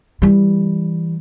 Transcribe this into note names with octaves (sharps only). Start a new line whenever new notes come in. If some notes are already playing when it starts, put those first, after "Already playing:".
E3 G3